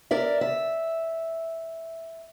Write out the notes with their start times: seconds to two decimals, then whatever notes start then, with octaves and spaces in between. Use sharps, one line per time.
0.11 A#4 D5 E5
0.41 E5